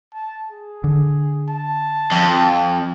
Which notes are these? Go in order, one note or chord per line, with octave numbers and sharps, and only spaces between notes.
A5
G#4
D3
A5
F2